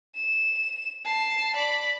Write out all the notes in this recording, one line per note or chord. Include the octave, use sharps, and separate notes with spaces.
E7
A5 C7
D5 B5